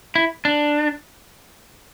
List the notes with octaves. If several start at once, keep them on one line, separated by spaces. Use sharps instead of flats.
E4
D4